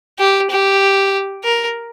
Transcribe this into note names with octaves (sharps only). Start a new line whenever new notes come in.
G4
G4
A#4